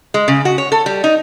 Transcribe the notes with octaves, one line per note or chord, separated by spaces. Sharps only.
G#3
C#3
F#4
C#5
A4
G3
D#4